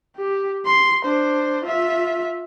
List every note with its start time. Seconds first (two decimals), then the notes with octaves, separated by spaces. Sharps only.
0.17 G4
0.66 C6
1.05 D4 C5
1.65 F4 E5